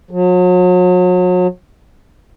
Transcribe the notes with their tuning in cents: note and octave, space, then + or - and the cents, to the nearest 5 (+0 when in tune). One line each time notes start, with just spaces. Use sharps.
F#3 -40